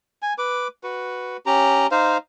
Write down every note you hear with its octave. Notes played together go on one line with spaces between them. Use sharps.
G#5
B4 D6
F#4 B4
C#4 G4 A#5
D#4 C5 F5